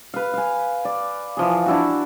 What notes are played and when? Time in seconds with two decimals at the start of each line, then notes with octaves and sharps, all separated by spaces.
0.14 B4 F5
0.34 F5 G#5
0.85 D5
1.37 E3 F3 G#4
1.66 D4 E4 F#4